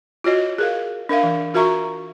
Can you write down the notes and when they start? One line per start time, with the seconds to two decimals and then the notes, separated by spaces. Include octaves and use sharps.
0.24 F4 F#4 C#5 D#5
0.58 G#4 A#4 F5
1.09 D4 A#4 E5 F5
1.23 E3
1.54 F4 F#4 A#4 E5 A#5 C#6